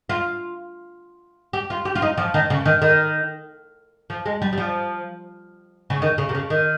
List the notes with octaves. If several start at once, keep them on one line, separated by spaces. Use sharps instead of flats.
F4
G4
F4
G4
F4
D#4
F3
D#3
C#3
D#3
D#3
F3
G#3
G3
G3
F3
C#3
D#3
C#3
C3
C#3
D#3